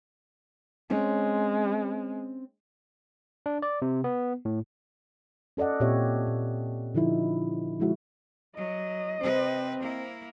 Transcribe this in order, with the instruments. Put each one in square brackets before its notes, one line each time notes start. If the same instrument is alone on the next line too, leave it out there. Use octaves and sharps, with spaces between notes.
[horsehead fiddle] G#3 [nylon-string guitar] C4 C#4 C#5
[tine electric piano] D4
D5
C3
B3
A2
[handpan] C#4 A4 D5 D#5 F#5
A#2 C4 G4 C#5 E5
A#2
D3 F3 D#4 E4
F3 G#3 E4 F#4
[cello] F#3 [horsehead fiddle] D#5
[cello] C3 B4 [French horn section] C4 [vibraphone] C5
[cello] A#3 E4